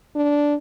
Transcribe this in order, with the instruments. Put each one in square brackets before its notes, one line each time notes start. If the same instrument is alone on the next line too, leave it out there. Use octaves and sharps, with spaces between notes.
[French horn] D4